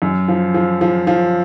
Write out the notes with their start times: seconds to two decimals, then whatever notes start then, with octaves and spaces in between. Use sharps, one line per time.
0.02 F#2
0.28 F3
0.54 F3
0.81 F3
1.07 F3